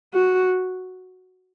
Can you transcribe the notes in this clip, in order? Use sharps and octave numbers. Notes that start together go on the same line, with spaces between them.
F#4